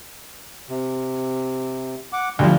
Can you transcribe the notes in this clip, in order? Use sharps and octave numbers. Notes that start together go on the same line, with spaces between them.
C3
F#5 D6
D2 F3 G3